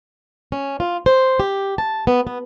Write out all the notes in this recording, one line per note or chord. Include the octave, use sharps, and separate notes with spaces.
C#4
F4
C5
G4
A5
B3
B3